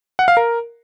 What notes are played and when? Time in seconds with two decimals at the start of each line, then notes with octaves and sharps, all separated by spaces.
0.19 F#5
0.28 F5
0.37 A#4